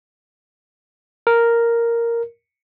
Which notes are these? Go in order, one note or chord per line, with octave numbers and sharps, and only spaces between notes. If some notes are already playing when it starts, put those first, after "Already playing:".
A#4